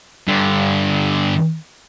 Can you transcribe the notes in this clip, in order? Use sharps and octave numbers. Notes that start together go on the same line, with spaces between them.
G2 D3